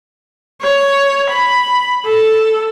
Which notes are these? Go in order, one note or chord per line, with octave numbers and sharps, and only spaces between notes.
C#5
B5
A4